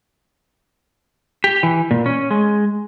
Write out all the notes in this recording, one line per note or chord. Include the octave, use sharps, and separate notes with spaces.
G4
E3
A#2
C#4
G#3